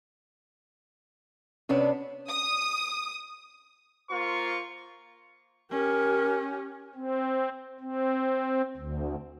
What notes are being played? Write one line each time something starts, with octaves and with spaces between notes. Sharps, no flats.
C3 B3 C#4 D4 B4 C#5
D#6
A#3 F4 C5 C#6
C#4 G4 A#4
C4
C4
D2